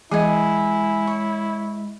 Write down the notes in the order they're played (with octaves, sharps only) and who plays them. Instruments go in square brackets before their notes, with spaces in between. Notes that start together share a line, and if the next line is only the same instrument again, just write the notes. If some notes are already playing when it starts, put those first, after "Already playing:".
[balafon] E3 D#5 [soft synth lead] G#3 [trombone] E4 [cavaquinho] G#4 F#5 G#5
[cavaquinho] C#5